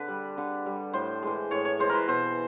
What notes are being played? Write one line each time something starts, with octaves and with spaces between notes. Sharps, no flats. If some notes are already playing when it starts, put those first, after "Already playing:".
Already playing: D3 B4
G3
D3
G3
A2 C5
E3 G#3
A2 C#5
C#5
E3 G#3 C5
A#4 B4
B2 C5